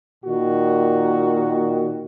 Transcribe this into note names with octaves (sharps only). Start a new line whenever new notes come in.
A#2 D#3 F#4